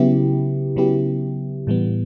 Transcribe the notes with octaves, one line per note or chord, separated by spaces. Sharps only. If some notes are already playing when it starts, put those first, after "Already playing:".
Already playing: C#3 F#3 B3 E4 G4
C#3 F#3 B3 E4 G4
A2 E3 G3 B3